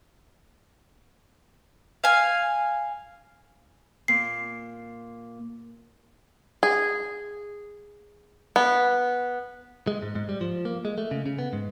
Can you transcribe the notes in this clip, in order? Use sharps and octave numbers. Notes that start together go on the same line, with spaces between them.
F5 G#5
A#2 C7
G#4
B3
G#3
G#2
G#2
G3
F3
A#3
G#3
A3
C#3
C#3
B3
G#2